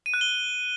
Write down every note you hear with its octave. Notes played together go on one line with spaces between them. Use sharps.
D#7
F#6
G7